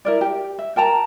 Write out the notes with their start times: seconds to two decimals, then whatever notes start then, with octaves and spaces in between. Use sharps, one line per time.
0.05 E4 A#4 D5
0.21 G4
0.59 E5
0.76 A#4 G5 A5 A#5